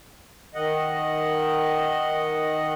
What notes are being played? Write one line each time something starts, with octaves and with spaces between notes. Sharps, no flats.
D#3 D#5 F#5